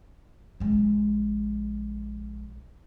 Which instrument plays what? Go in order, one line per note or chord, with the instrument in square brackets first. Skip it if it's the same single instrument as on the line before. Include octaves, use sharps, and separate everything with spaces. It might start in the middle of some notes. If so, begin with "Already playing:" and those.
[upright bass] A#1 G#3